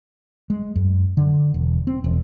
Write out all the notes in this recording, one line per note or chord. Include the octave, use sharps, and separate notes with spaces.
G#3
F#2
D3
E1
C4
E1